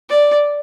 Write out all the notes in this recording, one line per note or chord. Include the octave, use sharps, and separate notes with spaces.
D5